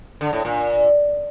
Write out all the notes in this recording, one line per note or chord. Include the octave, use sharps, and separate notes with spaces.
D3
A2
A#2